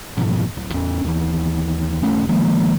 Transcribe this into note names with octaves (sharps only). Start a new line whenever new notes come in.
F#1 G#2 B2 F3
D1
E2 C#4
D#2 E3
D#1 A3 C#4
D#3 F3 G#3 A#3